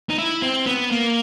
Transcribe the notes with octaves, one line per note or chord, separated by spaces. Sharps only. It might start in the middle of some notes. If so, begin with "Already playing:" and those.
D#4
E4
C4
B3
A#3